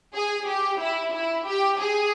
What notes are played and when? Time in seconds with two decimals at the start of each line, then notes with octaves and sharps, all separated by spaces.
0.15 G#4
0.47 G4
0.80 E4
1.13 E4
1.46 G4
1.79 G#4